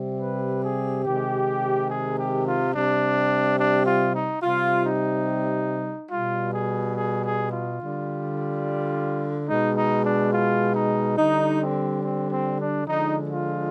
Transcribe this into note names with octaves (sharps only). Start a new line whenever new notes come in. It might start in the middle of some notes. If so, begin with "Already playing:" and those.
Already playing: C3 G3
B4
G#4
C3 D#3 G#3 G4
G#4
G4
F4
C3 G3 D4
D4
F4
D#4
C3 G3 F4
D#4
B2 G3 F4
G#4
G#4
G#4
F4
D3 G3
B2 G#3 D#4
D#4
D4
F4
D#4
D3 G3 D#4
C4
C4
C4
D4
D3 F3 G#3 D#4
F4